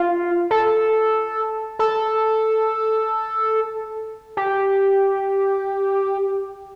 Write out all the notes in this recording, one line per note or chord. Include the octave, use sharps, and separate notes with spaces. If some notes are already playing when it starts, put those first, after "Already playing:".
Already playing: F4
A4
A4
G4